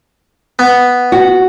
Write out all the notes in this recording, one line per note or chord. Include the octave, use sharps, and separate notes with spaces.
B3
F#4